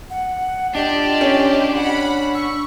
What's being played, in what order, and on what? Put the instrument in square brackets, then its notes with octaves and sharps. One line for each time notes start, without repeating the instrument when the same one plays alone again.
[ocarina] F#5
[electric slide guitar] D4 [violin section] F4 G4 [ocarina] D#5
[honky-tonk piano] C#4
[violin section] F#5 B5
[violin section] C#6 [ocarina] E6